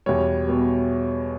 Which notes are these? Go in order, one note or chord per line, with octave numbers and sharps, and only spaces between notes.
E2 B2 G3 C#5
B2 G3